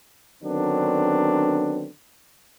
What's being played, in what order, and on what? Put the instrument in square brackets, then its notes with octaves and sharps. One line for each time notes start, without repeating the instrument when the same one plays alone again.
[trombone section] D3 D#3 F#3 B3 C4 D4